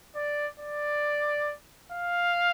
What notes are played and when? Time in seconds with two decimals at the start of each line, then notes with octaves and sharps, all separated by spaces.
0.16 D5
0.60 D5
1.92 F5